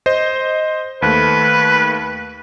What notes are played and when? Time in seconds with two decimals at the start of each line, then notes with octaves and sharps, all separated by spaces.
0.06 C5 D#5
1.02 D#2 A3 B4